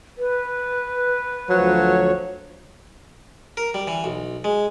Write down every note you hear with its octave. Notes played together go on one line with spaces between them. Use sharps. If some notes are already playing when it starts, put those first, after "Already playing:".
B4
D2 F3 F#3 C#5
A#4
G3
E3
B1
G#3